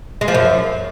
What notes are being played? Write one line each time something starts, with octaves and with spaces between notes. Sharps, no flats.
G#3
F3
F#2